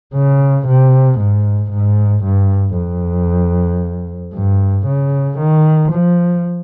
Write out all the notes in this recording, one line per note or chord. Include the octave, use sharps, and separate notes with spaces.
C#3
C3
G#2
G#2
G2
F2
G2
C#3
D#3
F3